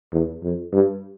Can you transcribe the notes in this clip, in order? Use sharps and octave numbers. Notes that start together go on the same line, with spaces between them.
E2
F2
G2